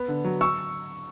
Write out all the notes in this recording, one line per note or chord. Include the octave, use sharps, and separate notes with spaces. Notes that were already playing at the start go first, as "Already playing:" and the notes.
Already playing: B3 B5
D3
F#3
C#6 E6